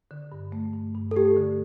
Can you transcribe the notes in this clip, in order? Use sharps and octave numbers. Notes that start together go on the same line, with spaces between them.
D3
G2
A3
G2
G2
A4
A3 G4
D3